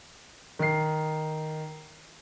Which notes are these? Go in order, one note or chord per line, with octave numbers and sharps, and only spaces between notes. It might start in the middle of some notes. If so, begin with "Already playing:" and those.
D#3 C7